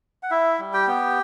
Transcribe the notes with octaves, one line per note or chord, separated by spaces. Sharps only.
F#5
E4 E5
G3
G4 G5
B3